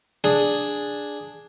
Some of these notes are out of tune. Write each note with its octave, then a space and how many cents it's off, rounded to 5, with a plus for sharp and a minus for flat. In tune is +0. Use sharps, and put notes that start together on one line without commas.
D4 +0 G#4 +0